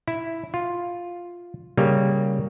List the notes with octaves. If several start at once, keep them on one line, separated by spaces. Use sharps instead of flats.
E4
F4
C#3 G3 A#3